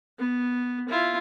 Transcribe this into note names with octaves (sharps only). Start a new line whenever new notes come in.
B3
E4 F4